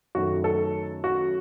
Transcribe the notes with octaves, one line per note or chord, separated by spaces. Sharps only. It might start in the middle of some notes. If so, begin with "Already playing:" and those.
F#2 D#3 A3 F#4
A4
F#4